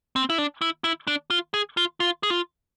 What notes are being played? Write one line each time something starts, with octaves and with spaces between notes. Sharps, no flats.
C4
E4
D4
E4
E4
D4
F4
G#4
F4
F4
G#4
F4